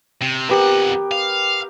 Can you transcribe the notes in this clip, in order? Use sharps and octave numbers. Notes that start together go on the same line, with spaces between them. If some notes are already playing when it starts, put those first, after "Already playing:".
C3
F2 B3 G4 A#4 F#5
F5